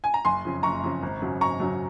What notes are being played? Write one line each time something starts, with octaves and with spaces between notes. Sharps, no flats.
G#5
A#5
F#1 G#5 C6
F2 C#3
F#1 A#5 C#6
F2 C#3
G#1
F#2 C#3 F#3
G#1 A#5 C#6
F#2 C#3 F#3